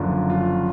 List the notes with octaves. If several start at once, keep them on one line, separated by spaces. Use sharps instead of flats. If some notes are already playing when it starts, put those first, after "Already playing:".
Already playing: F#1 F#2 D3 F3
F4